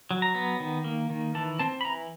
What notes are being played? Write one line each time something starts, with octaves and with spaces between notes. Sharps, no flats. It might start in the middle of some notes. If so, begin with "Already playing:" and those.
F#3
A#5
B3
D#3
A#3
D#3
E3 A5
C4 A5
B5
E3 A#5